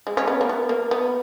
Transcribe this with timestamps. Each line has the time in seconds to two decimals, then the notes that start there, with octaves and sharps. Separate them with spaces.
0.07 G#3
0.17 C#4
0.27 B3
0.41 A#3
0.49 B3
0.69 A#3
0.91 B3